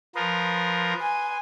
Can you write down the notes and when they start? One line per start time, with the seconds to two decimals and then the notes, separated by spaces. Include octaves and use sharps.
0.15 F3 A#4 B4 C6 D#6
1.02 G#5